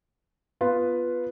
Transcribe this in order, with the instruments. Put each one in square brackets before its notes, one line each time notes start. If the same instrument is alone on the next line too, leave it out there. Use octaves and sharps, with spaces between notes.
[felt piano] B3 F4 B4